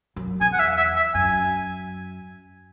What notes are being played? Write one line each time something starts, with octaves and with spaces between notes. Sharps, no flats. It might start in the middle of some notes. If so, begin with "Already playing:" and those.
F#2
E2 G#5
F#5
E5
E5
E5
F#2 G#5